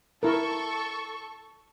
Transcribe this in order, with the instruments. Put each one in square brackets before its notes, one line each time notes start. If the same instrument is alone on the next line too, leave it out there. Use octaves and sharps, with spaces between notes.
[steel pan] E4 A#4 [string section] A4 C#6